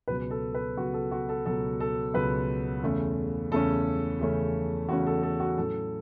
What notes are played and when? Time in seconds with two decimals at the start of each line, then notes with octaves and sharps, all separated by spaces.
0.08 C#2 B2 F#3 B4
0.30 A4
0.55 B4
0.77 C#2 B2 F#3 F#4
0.94 A4
1.12 F#4
1.29 A4
1.45 C#2 B2 F#3 A4
1.80 A4
2.14 C#2 B2 F#3 B4
2.82 E2 C#3 A3 C#4
3.51 E2 C#3 A3 C#4 A4
4.20 E2 C#3 A3 C#4
4.88 E2 C#3 A3 C#4 F#4
5.07 A4
5.23 A4
5.40 F#4
5.57 A2 F#3 C#4 A4